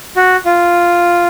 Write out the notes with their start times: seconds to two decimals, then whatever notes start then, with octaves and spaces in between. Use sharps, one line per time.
0.16 F#4
0.45 F4